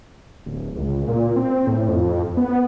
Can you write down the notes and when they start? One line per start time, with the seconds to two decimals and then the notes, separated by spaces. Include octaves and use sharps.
0.46 D1
0.76 C#2
1.08 A#2
1.36 C4
1.67 A2
1.88 F2
2.37 B3